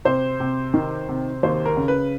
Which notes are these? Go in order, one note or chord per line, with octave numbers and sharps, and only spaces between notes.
C3 C5
C3
D#3
C3
D#2 C5
A#4
C#3
B4